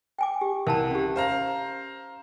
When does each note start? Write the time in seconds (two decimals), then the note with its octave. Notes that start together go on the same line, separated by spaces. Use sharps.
0.18 G5 G#5 D6
0.41 G4
0.67 C2 A#4 A5 A#5
0.91 C#4 G4
1.16 C5 F5 A#5